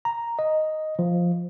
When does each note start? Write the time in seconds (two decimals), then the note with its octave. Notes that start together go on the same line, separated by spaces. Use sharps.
0.05 A#5
0.39 D#5
0.99 F3